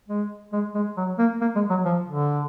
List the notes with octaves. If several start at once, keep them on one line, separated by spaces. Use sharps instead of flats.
G#3
G#3
G#3
F#3
A#3
A#3
G#3
F#3
F3
D3